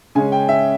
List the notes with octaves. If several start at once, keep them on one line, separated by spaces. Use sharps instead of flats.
C#3 G#3 C#4 G#5
G5
E5